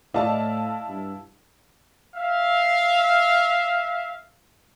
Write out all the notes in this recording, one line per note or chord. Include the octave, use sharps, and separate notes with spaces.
A2 E4 D5 D#5 F5 A5
G2
E5 F5